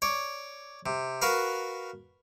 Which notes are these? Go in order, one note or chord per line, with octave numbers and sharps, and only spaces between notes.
C#5 D5
C3
F#4 A#4 B4 F5